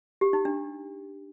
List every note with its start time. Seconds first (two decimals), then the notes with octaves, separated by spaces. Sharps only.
0.21 G4
0.33 D#4
0.45 D4